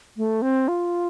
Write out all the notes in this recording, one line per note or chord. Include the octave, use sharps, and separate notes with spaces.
A3
C4
F4